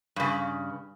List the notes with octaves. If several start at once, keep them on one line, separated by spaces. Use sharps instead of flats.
G2 C#3